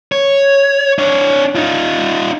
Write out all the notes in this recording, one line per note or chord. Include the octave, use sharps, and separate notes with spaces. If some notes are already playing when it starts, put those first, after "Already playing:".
C#5
D4 C#5
D#4 F4